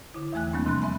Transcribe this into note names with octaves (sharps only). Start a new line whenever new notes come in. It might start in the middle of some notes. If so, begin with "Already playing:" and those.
D3 E4
E2 E3 A3 G#5 F#6
G3 A#3 C4 D4
D#2 C3 F3 B5 C6 F#6
E5 G#5 B5